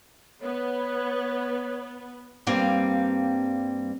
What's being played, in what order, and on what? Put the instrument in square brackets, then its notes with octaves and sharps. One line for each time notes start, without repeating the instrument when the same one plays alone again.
[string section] B3 [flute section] B4 C#5
[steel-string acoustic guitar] G2 G3 A#3 C4 F5